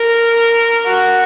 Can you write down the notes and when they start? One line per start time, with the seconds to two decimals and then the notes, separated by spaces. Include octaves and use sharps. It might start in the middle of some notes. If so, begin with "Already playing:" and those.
Already playing: A#4
0.87 F#4